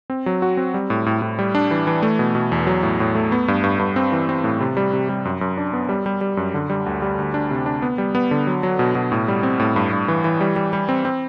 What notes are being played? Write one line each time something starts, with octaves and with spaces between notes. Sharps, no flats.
C4
F#3
F#4
C4
G3
A2
A2
A2
G3
D4
E3
E3
A3
B2
B2
E2
F#3
A2
A2
A3
B3
G2
G2
G2
C4
E3
C4
A2
C3
G3
C3
G3
F#2
F#2
D4
B3
G3
G3
G3
F#2
D3
G3
D2
G3
D2
D4
C3
D4
B3
G3
B3
D3
F#3
F#3
B2
B2
A2
G3
C4
A2
G2
G2
E3
E3
G3
G3
G3
C4
C4